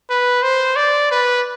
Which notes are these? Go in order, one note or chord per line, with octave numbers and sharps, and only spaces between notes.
B4
C5
D5
B4